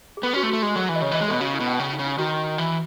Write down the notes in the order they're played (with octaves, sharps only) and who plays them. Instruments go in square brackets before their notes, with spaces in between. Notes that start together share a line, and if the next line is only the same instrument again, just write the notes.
[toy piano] G#4
[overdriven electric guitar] B3 [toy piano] A4
[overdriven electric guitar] C#4 [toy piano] F#4
[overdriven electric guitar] A3
[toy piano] F#4
[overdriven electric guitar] A3
[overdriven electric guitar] G#3 [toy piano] G#4
[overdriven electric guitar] F#3 [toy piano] A4
[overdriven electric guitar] E3
[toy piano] D#5
[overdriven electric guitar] C#3 [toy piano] C#5
[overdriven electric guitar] E3 [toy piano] D#5
[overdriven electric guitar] G#3
[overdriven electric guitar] B2 [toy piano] A4
[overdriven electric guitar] C#3 [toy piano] F#4
[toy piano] E4
[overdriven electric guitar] B2
[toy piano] C#4
[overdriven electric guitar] C#3 [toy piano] C#4
[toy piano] D#4
[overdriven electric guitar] C#3
[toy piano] D#4
[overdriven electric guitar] D#3 [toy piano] F#4
[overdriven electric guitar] E3